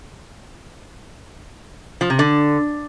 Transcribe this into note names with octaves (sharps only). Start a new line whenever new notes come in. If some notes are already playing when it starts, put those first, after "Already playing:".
F3
C3
D3